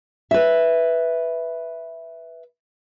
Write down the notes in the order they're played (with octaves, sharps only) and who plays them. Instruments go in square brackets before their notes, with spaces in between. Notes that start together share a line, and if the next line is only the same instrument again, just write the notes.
[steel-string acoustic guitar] B4 E5